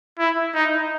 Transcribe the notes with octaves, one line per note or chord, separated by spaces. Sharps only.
E4
D#4